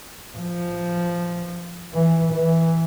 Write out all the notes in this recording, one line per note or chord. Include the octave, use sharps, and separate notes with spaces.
F3
E3
E3